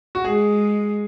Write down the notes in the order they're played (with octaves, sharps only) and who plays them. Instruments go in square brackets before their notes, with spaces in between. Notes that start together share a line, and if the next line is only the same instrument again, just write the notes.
[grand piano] F#4
[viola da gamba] G#3 [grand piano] G#4